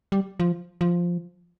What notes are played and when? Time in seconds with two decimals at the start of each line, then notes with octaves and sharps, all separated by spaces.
0.12 G3
0.40 F3
0.81 F3